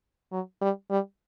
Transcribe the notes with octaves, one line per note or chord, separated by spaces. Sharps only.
F#3
G3
G3